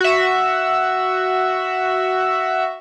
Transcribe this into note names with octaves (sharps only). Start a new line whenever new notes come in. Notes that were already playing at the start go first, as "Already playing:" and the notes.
F#4 E5